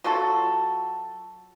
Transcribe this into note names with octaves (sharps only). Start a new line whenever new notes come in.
F#3 F4 F#4 A4